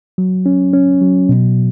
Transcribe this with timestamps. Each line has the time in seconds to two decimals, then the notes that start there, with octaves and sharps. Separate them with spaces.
0.18 F#3
0.46 C#4
0.73 C#4
1.01 F#3
1.29 B2